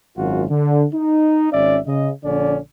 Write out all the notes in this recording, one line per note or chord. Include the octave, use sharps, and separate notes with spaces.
G#1 F#2 F4 F#4
D3
D#4
G#1 C#4 D5 E5
C#3 D#5
A#1 D3 C#4 D5